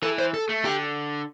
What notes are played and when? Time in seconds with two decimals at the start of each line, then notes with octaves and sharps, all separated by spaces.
0.03 E3 A4
0.19 C5
0.34 A4
0.49 A3
0.65 D3 G4